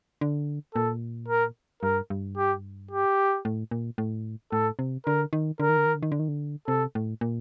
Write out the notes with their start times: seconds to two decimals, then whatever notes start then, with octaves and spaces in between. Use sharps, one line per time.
0.21 D3
0.75 A#2 A4
1.28 A#4
1.83 G2 A#4
2.10 G2
2.37 G4
2.91 G4
3.45 A2
3.71 A#2
3.98 A2
4.52 A2 A4
4.79 C3
5.06 D3 A#4
5.33 D#3
5.60 D3 A#4
5.69 D#3
5.77 D3
5.86 D#3
5.95 D3
6.03 D#3
6.12 D3
6.19 D#3
6.28 D3
6.67 C3 A4
6.95 A2
7.21 A#2